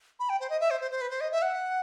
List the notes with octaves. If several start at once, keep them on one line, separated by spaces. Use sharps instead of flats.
B5
G5
C5
D#5
E5
C5
C5
C5
B4
C5
D#5
E5
F#5